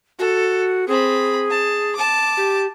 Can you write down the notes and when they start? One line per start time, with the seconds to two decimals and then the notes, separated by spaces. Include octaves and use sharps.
0.19 F#4 A4
0.88 C4 G#4 B5
1.50 A5
1.96 A5 D6
2.37 G4